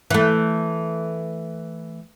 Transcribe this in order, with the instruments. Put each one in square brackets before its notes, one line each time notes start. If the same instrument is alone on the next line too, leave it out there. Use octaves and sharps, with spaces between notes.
[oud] E3 A3